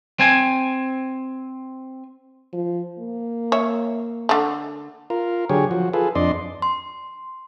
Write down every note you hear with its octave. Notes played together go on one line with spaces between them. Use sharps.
C4 G#5
F3
A#3
C#5 E5
D3 A3
F4 A#4
D3 F#3 G4 G#4 C#5
F3 F#4
F4 G#4 A4 B4
F2 D4 D5 D#5 C6
C6